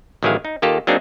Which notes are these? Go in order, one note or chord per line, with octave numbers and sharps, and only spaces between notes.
A1 D#3 F#3 E4 G#4 F5
D#4
D#3 A#3 F4 G4 A4
F#3 A#3 C4 D4 D#4 G#4